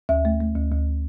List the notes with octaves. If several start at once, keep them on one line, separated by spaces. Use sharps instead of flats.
D2 E5
A3
A3
D2
D2